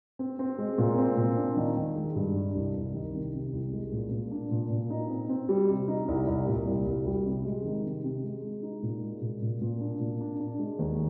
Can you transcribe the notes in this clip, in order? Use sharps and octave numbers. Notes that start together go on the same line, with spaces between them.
C4
C4
G#3
A#2
C4
A#2
D4
D#3
D#3
G#3
G2
D4
C2
C2
D#3
C3
C3
C2
G#3
A#2
A#2
D4
A#2
A#2
D#4
C4
C4
G3
C3
D#4
C2
C2
A#2
C2
C2
G3
C3
G#3
D#3
C3
C3
G#3
G#3
D#4
A#2
G#3
A#2
A#2
A#2
D4
A#2
D4
D4
G#3
D#2